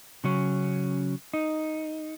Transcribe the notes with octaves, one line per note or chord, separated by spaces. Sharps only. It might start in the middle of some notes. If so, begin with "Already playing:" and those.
C#3 F#3 C#4
D#4